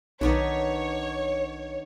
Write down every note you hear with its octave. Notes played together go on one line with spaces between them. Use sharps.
B1 D#3 B3 D4 C#5